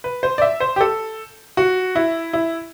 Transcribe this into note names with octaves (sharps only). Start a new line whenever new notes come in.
B4
C5
D5
E5
C5
G4
A4
F#4
E4
E4